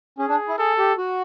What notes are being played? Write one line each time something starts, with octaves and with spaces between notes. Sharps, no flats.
C#4 G#4
D4
E4
G#4 A4
G4
F#4